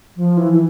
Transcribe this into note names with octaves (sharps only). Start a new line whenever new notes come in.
F3
E3
E3